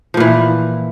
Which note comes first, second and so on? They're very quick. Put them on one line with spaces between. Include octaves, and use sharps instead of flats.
F3 A#2 E3